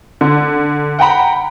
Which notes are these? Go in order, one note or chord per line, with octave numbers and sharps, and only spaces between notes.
D3
F#5 G5 A#5 B5